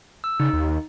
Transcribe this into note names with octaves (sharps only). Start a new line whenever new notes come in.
E6
C#3 D#4
D#2